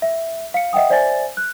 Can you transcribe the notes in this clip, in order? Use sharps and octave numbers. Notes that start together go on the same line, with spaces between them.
E5
F5 C#7
D#5 E5 F#5 G5 D#6
C5 D5 E5 G#5 A6
F#6